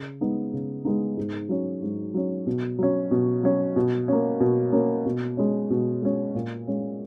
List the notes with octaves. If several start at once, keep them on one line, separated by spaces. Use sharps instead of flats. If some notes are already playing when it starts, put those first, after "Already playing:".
Already playing: C#3
G#3 B3 D#4
C#3
G#3 B3 D#4
G#2
F#3 C#4
G#2
F#3 C#4
B2
F#3 C#4
B2
F#3 C#4
B2
A#3 C#4
B2
A#3 C#4
B2
G#3 C#4
B2
G#3 C#4
A#2
G#3 C#4